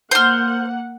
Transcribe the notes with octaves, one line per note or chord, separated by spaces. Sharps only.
A#3 C5 F#5 F6